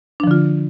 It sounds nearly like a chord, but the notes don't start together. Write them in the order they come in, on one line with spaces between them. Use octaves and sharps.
D4 F3 D3 F4